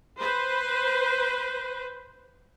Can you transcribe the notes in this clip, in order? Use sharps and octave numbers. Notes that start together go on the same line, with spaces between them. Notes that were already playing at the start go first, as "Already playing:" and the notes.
B4 C5